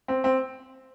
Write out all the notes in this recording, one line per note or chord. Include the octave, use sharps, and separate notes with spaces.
C4
C4